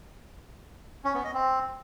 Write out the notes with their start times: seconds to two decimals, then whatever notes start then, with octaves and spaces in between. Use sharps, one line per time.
1.05 C#4
1.14 B3
1.24 D#5
1.34 C4